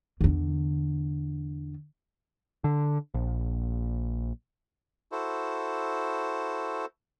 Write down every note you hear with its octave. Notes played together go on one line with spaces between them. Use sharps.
E2 D3
D3
A#1
E4 F#4 A4 C5